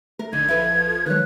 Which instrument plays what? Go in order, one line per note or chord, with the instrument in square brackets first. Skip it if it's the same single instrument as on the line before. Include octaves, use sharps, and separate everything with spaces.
[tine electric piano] A3 [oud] A#4
[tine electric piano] A#1 [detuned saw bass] D3 [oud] D#4 [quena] G#6
[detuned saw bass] F3 [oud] E4 A4 B4
[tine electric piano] D#3 F#3 G#3 [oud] B4 C#5 [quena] F#6